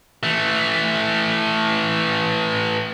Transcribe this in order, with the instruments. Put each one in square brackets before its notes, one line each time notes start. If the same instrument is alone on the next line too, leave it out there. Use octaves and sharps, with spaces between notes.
[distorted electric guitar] E3 A3